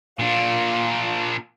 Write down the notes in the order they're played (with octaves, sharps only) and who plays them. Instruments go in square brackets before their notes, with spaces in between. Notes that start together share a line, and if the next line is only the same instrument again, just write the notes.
[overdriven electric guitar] A#2 D4 [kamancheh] F4